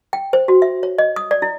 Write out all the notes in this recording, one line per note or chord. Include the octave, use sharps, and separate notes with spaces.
G5
C5
F#4
E5
C#5
D#5
D#6
D5
E4